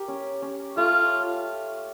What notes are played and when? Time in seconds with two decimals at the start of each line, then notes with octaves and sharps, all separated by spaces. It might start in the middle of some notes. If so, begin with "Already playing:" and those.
Already playing: G4 A#4
0.08 C#4
0.42 C#4
0.77 A3 F4